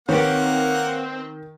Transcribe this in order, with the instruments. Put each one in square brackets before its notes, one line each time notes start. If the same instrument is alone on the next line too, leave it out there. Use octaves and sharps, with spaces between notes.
[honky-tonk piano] D#3 [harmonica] A#3 F#5 [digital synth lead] C4 [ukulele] G4 B4 C#5